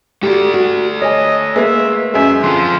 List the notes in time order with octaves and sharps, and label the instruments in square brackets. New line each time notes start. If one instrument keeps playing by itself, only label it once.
[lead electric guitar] A3 D5 [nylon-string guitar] F#4 G4
[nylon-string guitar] F#4
[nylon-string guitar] C#5 G#5 [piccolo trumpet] D#5
[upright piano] G#3 A#3 [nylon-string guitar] B4 [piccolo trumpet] E5
[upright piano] F#2 G#3 [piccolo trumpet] E5
[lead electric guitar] F2 F3 [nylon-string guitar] D3 [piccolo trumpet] C6